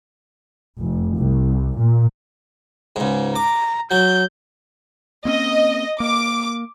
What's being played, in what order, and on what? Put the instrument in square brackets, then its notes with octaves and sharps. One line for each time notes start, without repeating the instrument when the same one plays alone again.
[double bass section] F1
C2
A#2
[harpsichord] C#2 G#2
[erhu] A#5 [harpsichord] D6
[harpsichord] F#3 [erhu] G6
[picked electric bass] A#3 C4 C#4 [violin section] D#5
[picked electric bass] A#3 [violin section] D6